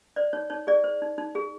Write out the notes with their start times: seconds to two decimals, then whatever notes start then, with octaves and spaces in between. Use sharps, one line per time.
0.16 C5 D5
0.33 D#4 C#5
0.50 D#4 C#5
0.67 G#4 D5
0.84 C5
1.02 D#4
1.18 D#4
1.35 G#4